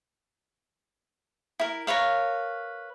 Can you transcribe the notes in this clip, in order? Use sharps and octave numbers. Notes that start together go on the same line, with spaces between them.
E4 A#4
A#4 B4 C#5 F5